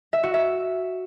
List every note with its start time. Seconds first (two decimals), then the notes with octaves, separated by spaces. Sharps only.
0.13 E5
0.23 F#4
0.34 E5